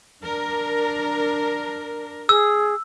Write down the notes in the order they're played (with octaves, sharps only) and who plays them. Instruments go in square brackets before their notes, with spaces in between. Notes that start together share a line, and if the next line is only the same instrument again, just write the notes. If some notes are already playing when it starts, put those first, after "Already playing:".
[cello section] D4 A#4
[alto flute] G#4 [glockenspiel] E6